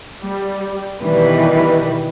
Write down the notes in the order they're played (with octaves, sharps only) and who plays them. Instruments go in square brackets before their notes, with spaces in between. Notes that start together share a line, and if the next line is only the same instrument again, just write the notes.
[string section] G3
B2 D#3 E3 G3 B4